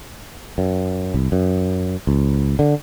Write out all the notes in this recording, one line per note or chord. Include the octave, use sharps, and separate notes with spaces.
F#2
C2
F#2
C#2
D3